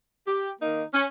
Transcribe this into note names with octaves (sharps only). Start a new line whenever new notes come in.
G4
D#3 A#3 D#4
C#4